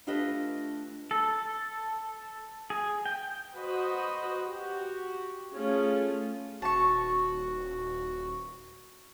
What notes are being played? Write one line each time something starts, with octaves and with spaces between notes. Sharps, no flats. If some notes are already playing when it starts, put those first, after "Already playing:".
A3 D4 F4 G4 B4 D#5
A4
G#4
G5
F#4 B4 C5 D#5
F#4 G4
A3 C#4 F4 G#4
D#1 F#4 A5 C#6